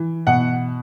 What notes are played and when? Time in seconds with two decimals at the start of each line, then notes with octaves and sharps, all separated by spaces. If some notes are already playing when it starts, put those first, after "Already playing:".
Already playing: E3
0.27 B2 F#5